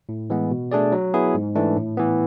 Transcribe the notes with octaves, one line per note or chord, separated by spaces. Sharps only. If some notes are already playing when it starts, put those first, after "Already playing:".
A2
E3 G#3 B3
B2
A3 D4 G#4 D5
F#3
B3 E4 G#4
G#2
E3 A3 D4
A2
E3 B3